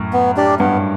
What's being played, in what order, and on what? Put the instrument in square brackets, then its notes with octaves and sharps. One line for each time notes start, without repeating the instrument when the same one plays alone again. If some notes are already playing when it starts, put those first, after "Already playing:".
Already playing: [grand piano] F#2 A2
[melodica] B3
D4 G4 D5
[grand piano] G2 [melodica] B3